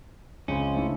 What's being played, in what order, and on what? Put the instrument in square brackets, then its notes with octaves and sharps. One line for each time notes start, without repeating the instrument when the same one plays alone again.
[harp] C#2 C4 B5 [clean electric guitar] C#4
[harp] A3 D4 E4